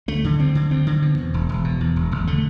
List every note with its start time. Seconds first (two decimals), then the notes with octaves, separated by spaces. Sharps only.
0.08 D2 A3
0.24 D3
0.40 D2 C4
0.55 D3
0.71 D2 C4
0.87 D3
1.02 B2
1.18 E2
1.34 E1
1.49 E1
1.64 B2
1.81 E2
1.96 E1
2.11 E1
2.27 D3 A3